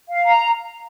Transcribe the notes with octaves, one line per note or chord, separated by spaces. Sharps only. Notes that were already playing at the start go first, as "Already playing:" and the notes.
F5
A#5